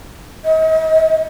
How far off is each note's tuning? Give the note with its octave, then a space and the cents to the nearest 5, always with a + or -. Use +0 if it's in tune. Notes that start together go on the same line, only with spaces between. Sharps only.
D#5 +40